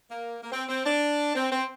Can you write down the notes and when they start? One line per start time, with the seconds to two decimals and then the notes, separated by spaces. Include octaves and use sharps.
0.11 A#3
0.43 A#3
0.52 C4
0.69 C4
0.85 D4
1.35 C4
1.52 C4